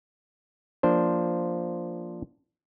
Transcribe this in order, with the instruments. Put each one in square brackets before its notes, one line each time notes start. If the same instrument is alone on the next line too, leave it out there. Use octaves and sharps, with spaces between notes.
[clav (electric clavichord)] F3 A#3 D4 C5